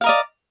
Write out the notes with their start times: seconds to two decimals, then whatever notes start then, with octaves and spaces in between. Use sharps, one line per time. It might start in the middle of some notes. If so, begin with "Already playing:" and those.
0.01 F5
0.04 A#4
0.06 D#5
0.09 D5